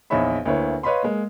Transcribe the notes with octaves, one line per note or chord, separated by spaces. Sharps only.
A#1 E2 D#4 C#5 E5 B5
D2 A#3 E4 B4 C#5
B4 C#5 D#5 F5 B5 C6
G#3 A#3